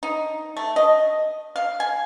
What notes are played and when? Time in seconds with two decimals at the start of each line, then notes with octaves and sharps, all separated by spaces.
0.03 D#4
0.57 A3
0.76 D#5
1.56 F5
1.80 G#5